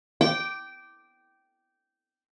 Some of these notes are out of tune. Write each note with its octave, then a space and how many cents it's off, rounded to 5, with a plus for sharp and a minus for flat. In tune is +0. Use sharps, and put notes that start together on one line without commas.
G5 -15 D6 +0